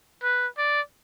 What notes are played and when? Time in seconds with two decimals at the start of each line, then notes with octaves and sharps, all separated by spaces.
0.23 B4
0.57 D5